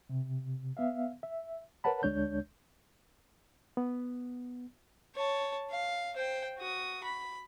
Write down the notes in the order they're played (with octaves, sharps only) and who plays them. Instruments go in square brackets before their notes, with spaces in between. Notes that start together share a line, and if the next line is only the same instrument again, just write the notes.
[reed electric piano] C3
B3 E5 F5
E5
A#4 B4 C#5 F#5 A5 B5
D2 G#3 D4 C#5 G6
B3
[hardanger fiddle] C#5 A5
F5
C5 G5
F#4 D#6
B5